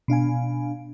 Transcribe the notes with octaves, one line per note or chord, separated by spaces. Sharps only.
B2 D4 F5 G#5